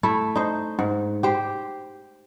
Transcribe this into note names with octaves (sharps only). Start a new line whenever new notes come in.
A3 E4
D#4 C5
G#2
G4 C5